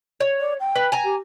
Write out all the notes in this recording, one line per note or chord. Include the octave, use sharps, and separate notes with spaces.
C#5
D5
G5
B4
G#5 A#5
G4